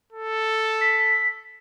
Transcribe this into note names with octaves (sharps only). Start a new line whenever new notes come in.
A4
B6